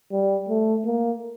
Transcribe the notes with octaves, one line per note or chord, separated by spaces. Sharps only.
G3
A3
A#3